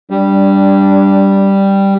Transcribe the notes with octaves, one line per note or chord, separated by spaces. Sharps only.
G3 D4